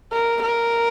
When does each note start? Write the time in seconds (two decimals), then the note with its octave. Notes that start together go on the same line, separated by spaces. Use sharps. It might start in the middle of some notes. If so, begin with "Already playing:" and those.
0.12 A#4
0.42 A#4